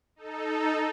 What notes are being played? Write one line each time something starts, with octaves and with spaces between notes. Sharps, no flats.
D#4 A4